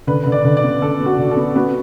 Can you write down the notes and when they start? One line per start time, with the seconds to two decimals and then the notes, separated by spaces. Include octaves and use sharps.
0.07 D3 B4
0.23 D3 B4
0.32 D5
0.45 D3
0.57 D5
0.64 B3
0.82 D3 A4
1.00 B3
1.06 F#4
1.18 D3
1.31 A4
1.37 B3
1.55 B3 F#4